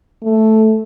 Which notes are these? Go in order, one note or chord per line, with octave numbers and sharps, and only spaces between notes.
A3